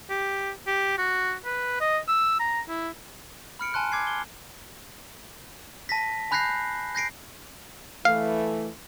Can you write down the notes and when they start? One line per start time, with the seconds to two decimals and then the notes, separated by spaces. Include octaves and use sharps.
0.10 G4
0.67 G4
0.98 F#4
1.45 B4
1.81 D#5
2.08 E6
2.40 A#5
2.69 E4
3.59 B5 F6 C#7 D7
3.74 G#5 A5 C6 F#6
3.92 D6 G#6 C7
4.07 G7
5.89 A5 A#6 B6
6.31 G#5 B5 F#6 G6 A#6 C7
6.95 G6 A#6 C7 D7
8.05 E3 A3 F5